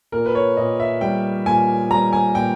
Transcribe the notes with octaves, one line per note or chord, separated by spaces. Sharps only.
A#2 A#4
B4
C#5
A#2 D#5
E5
G3 G5
A#2 G#5
G3 A#5
G#5
A#2 G5